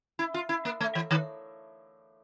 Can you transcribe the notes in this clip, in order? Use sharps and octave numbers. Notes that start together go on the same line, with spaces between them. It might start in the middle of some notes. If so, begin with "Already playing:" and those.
E4
F4
E4
A#3
A3
E3
D#3